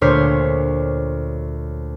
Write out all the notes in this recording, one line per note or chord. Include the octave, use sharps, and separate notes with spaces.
D2 A#2 C5 C#5 F6 B6